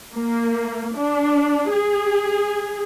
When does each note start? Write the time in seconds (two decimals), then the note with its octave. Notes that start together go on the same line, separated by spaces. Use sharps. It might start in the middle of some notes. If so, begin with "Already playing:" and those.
0.13 A#3
0.96 D4
1.71 G#4